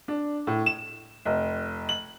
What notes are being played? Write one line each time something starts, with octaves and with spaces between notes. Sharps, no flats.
D4
A2
E7
F1
F#7